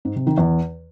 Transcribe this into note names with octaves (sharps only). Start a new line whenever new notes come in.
G#2
C3
D#3
E2